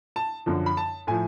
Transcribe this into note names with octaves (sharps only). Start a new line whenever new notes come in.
A5
F#2 D3 F3
B5
A5
A2 F3 G#5